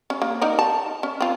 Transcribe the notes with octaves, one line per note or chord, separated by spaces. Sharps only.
C#4
A#3
D#4 A#4 D5
A5
C#4
C4 F4